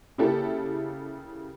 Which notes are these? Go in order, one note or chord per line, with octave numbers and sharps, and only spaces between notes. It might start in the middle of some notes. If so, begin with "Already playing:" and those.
C#3 A#3 E4 G4 A4